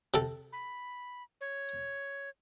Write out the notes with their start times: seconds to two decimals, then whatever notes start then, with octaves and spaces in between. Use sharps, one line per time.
0.14 C3 A4
0.53 B5
1.41 C#5